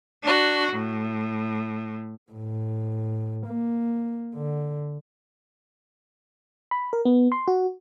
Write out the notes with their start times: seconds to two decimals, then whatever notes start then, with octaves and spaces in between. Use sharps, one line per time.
0.23 D4 F#4
0.73 A2
2.32 A2
3.47 A#3
4.35 D3
6.71 B5
6.93 A#4
7.05 B3
7.32 C6
7.48 F#4